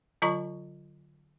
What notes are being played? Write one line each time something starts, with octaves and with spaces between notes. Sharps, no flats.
D3 F#3 F4 D#5 A#5 C#6